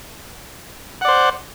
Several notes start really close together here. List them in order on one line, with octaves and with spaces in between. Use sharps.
F#5 D5 C5